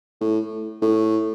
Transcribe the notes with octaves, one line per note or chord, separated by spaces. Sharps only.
A2
A2